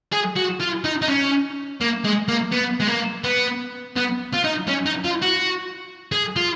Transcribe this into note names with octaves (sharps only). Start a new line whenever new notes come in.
G#4
F#4
F4
D#4
D#4
C#4
A#3
G#3
A#3
B3
G#3
A#3
B3
B3
F4
D#4
C#4
D#4
F4
F#4
G#4
F4